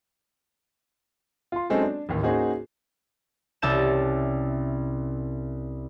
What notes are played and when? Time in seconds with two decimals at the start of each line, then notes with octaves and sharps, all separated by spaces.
1.52 F4 C6
1.70 F#3 G#3 C4 C#4 D#4 A4
1.82 D4
2.09 A1 D#2
2.23 A#3 C#4 D#4 F#4 G#4 C5
3.62 C2 C#4 E5 A5 G6 E7